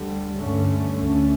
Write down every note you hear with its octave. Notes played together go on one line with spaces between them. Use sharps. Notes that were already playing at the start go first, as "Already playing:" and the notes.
Already playing: D2 D3 G3
G2 D3 A3 C#4
D2 D3 A3 C#4